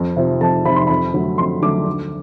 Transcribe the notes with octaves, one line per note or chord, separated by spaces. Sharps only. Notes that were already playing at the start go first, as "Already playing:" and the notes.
Already playing: F2
C3 F3
F2 A5
C3 F3 B5
C6
F2 B5
D3 F#3 A3
F2 C6
D3 F#3 A3 D6
D2